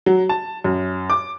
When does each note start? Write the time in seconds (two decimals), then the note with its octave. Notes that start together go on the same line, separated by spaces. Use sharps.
0.06 F#3
0.29 A5
0.64 F#2
1.10 D6